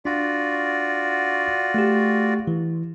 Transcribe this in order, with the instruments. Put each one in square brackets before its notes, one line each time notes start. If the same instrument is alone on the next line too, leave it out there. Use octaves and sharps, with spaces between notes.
[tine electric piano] D4 F#5 [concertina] F4 F#4 D5
[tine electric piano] A3 G4
E3